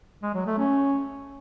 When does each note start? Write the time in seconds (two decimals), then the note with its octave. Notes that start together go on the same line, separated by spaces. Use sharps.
0.23 G#3
0.34 F#3
0.46 A3
0.58 C#4